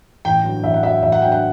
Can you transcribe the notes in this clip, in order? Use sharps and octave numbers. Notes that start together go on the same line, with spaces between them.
A1 G5
G2 D3 F#3
A1 E5
F#5
G2 D3 F#3 E5
A1 E5
F#5
G2 D3 F#3 G5
F#5